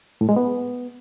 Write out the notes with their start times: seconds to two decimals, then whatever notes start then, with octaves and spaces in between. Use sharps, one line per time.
0.21 A2
0.29 G#3
0.36 B3